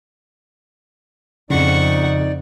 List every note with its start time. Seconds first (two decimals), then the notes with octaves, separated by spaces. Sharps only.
1.50 F2 C#3 D#4 D5 F#5 C#6